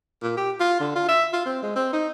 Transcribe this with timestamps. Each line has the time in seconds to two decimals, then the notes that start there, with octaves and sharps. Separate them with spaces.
0.23 A#2
0.37 G4
0.60 F4
0.80 D3
0.95 F4
1.08 E5
1.33 F4
1.46 C4
1.62 G#3
1.76 C4
1.93 D#4